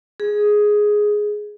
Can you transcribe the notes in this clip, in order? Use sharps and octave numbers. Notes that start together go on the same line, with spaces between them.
G#4